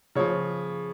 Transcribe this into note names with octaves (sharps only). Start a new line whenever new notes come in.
C#3 F3 C#5